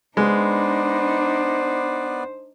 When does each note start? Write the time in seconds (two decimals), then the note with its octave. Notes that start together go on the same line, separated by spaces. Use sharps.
0.17 G#3 B3 D4 D#4 B4 C5 D5